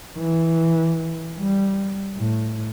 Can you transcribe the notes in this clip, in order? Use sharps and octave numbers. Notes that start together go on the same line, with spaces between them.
E3
G3
A2